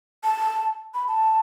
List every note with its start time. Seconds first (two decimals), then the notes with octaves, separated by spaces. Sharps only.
0.24 A5
0.94 B5
1.08 A5